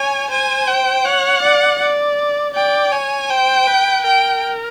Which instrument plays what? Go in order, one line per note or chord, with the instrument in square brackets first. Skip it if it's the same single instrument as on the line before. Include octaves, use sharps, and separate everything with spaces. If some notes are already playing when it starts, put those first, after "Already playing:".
Already playing: [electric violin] C#5 [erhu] G#5
[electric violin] C5 [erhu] G#5
[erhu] G5
[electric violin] C#5 [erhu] F#5
[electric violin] D5
D5
[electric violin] D5 [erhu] G5
[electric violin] C#5 [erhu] G#5
[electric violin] C5 [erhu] G5
[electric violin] B4
[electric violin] A#4 [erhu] G5